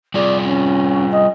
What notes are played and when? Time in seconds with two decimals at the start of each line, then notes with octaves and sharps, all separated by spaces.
0.14 G3 F4 G#4 D5
0.45 C#4
1.11 D#5